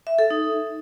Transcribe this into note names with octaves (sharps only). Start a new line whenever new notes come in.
E5
A4
D#4